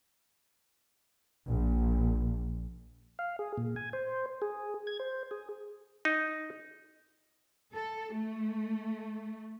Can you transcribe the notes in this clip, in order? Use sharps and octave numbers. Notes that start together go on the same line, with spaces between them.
A#1
F5
G#4
A#2
G#5
C5
G#4
G#6
C5
G#4
D#4
A4
A3